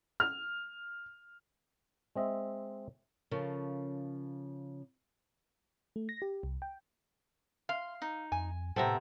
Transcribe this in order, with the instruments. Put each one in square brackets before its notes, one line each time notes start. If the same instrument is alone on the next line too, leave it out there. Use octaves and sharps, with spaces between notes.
[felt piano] F6
[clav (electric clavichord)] G#3 C4 D#5 E5
[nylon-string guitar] C#3 F3 C#4 A4 A#4
[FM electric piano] A3
A#6
G4
C2
G5
[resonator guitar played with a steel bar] F5 [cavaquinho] C6
[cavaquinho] D#4
[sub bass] F2 [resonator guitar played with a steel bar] G#5
[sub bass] A2 [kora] C3 B3 C4 [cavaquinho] A4 E5 A#5